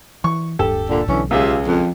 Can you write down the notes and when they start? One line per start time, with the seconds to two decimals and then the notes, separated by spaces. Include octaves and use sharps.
0.24 E3 C#6
0.59 D1 G2 G4 A4 A5
0.89 A#2 D3
1.08 B1 D3 E3 C#4
1.31 C#2 F4 G4 G#4 E5
1.66 F2